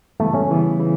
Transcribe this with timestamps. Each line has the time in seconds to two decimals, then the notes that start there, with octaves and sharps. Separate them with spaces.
0.20 C#3 E3 G3 A3 B3
0.34 C#4
0.50 C#3 E3 G3 B3
0.79 C#3 E3